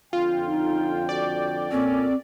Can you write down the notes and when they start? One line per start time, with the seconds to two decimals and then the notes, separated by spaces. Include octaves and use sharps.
0.13 F2 D3 F4 G5
0.47 D#4
1.09 F#4 D5
1.71 A#2 C4 C#4 A4